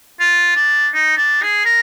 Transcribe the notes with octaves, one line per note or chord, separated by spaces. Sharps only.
F4
D4
D#4
D4
G#4
A#4